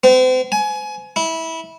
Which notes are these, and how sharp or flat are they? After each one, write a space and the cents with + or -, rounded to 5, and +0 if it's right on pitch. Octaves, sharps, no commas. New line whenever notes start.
C4 -40
G#5 +25
E4 -20